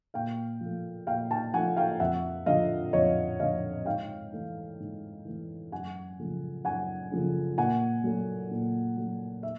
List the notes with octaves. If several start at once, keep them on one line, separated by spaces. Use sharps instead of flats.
A#2 F5 G5
F3 A3
A#2 F5 G5
G5 A5
F3 A3 F#5 G#5
F5 G5
F2 E5 F#5
D3 F3 D#5 F5
F2 C#5 D#5
D3 F3 D#5 F5
G#2 F5 G5
E3 A3
G#2
E3 A3
F#2 F#5 G#5
C#3 F3 A3
F#2 F#5 G#5
C#3 F3 A3
A#2 F#5 G#5
F#3 A3
A#2
F#3 A3
E5